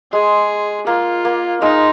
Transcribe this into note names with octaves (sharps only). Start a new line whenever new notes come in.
G#3 G#4
A#3 F4
A#3
G#3 D#4